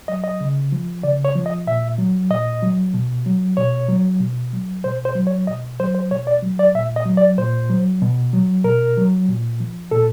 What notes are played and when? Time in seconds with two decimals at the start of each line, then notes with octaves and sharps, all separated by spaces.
0.08 F#3 D#5
0.24 D#5
0.41 C#3
0.72 F3
1.03 C#3 D5
1.25 C#5
1.35 F3
1.46 D#5
1.67 A#2 E5
1.98 F#3
2.30 A#2 D#5
2.62 F#3
2.94 B2
3.26 F#3
3.57 B2 C#5
3.89 F#3
4.20 B2
4.53 F#3
4.84 B2 C5
5.05 C5
5.15 F#3
5.27 C#5
5.47 B2 D#5
5.80 F#3 C5
5.95 C5
6.11 B2 C#5
6.27 D5
6.42 F#3
6.59 D5
6.75 A#2 E5
6.96 D#5
7.06 F#3
7.17 D5
7.38 A#2 C5
7.70 F#3
8.02 B2
8.33 F#3
8.64 B2 A#4
8.97 F#3
9.28 A#2
9.60 F3
9.91 A#2 A4